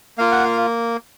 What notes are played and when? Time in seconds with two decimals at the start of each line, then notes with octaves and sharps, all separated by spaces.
0.18 A#3 F4 F5
0.32 F#5
0.44 F5